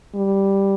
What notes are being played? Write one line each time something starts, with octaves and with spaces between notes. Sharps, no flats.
G3